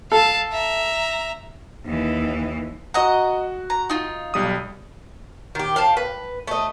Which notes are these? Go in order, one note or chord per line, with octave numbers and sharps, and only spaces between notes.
A4 F5 A5
E5 A#5
D#2 E3
F#4 D#5 F#5 A#5
A#5
D#4 F4
B1 G3 D#6
D#3 G4
F5 G5 A5
B4
A3 D#5